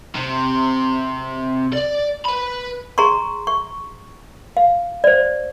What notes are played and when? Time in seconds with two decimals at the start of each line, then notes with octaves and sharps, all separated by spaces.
0.16 C3
1.73 D5
2.25 B4 B5
2.98 G#4 A#5 C6 C#6
3.47 C#6
4.57 F5
5.04 C5 D5